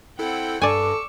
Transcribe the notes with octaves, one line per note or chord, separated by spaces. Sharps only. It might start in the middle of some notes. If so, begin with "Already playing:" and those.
C4 E4 A4 F#5 G5
G2 A4 D5 G#5 C#6 D6 E6